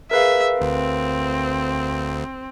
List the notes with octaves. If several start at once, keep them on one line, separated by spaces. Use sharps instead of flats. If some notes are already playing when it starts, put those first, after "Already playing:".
G#4 A#4 B4 E5 F5
D2 C4